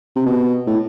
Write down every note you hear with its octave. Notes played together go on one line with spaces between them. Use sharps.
C3
B2
A2